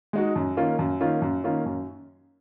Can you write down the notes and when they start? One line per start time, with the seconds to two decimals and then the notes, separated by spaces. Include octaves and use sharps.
0.13 G#3 D#4 F#4
0.36 F#2
0.57 D#3 A#3 C#4 F4
0.79 F#2
1.00 D#3 A#3 C#4 F4
1.22 F#2
1.44 D#3 A#3 C#4 F4
1.66 F#2